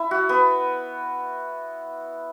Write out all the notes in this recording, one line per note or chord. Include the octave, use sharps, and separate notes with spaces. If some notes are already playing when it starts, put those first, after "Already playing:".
Already playing: E4
F#4
B3